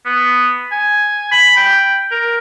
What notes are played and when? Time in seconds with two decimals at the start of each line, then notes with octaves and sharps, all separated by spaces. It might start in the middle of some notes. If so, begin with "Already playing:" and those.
0.05 B3
0.71 G#5
1.31 B5
1.57 G5
2.11 A#4